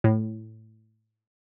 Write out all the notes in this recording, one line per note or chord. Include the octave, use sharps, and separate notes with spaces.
A2